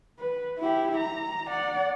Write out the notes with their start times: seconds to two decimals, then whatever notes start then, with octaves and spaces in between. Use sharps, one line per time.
0.19 B4
0.59 E4 G4
0.97 A#5
1.48 D5 F#5